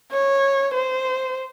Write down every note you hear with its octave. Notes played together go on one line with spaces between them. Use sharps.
C#5
C5